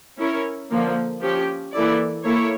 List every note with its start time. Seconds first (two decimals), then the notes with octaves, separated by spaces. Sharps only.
0.18 C#4 E4 A#4 C#5
0.70 D3 F3 A#3
1.21 F3 C#4 G4
1.73 E3 A#3 E4 A4 D5
2.25 A#3 E4 A4 C#5